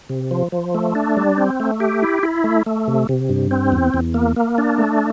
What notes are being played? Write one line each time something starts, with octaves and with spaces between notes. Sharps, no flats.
C3
F3
F3
A3
D4
G3
C4
A3
G4
E4
E4
A3
A3
C3
C3
G2
C4
E2
E2
A#3
A#3
D4
A3